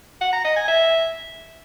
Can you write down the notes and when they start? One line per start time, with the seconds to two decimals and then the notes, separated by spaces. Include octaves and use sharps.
0.21 F#5
0.33 A#5
0.44 D#5
0.56 G#5
0.68 E5